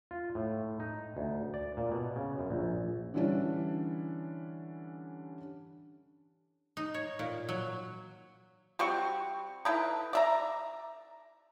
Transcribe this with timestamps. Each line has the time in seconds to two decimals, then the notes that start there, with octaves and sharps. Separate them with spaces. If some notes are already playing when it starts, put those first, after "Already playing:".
0.11 F4
0.35 A2
0.80 D#4
1.17 D2
1.54 D5
1.77 A#2
1.92 B2
2.16 C#3
2.39 F#2
2.50 A#1
3.14 D3 E3 G3 C#4 D4
6.77 D#4
6.94 C#5
7.19 A#2
7.49 F#3
8.79 G3 C4 F#4 C#6
9.65 D#4 E4 A4 B4
10.13 D5 E5 A#5